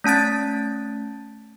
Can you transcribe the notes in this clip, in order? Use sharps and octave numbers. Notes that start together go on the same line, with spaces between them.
A3 C#4 A5 F#6 A6